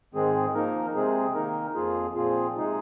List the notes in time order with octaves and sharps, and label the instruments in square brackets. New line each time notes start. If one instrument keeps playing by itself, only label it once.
[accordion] G#2 D#3 G#3 C4 G#4
F3 A#3 D#4 A#4
C3 G#3 C4 G#4
D#3 A#3 D#4 A#4
F2 F3 A#3 F4 G#4
A#2 F3 C4 F4 G#4
C3 G#3 D#4 G#4